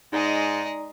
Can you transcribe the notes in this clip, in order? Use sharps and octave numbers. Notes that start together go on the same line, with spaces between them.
G#2 G#3 D#4 D5 D#5 A#5